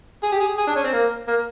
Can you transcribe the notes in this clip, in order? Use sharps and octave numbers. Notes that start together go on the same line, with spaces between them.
G#4
G4
G#4
G#4
D4
C#4
C4
A#3
A#3